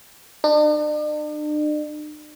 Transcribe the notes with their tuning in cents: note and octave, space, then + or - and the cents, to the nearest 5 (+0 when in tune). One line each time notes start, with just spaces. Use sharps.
D4 +45